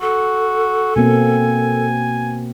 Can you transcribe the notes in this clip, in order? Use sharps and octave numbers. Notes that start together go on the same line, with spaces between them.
F#4 A4
B2 A#3 C4 G#5